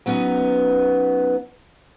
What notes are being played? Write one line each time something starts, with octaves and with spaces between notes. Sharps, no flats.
F#3 B3 C#4 D#4